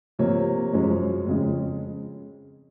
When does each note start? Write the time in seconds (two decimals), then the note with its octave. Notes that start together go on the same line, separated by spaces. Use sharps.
0.19 C3 F3 A#3 C#5
0.73 F#2 F3 G#3 C#4
1.27 F2 C#3 G#3